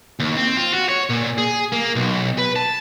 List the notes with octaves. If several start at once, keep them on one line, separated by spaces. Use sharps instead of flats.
D#2
C4
F4
F#4
C#5
A#2
G#4
A#3
B1
B4
A5